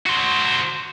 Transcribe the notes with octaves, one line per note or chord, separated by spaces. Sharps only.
F#4 C5